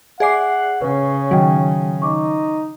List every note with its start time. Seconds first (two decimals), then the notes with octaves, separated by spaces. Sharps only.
0.20 G#4 D5 E5 F#5 G#5 D6 C7
0.81 C#3 B4 C#5
1.31 D#3 F#3 F#4 G5
2.02 D#4 C#6 D6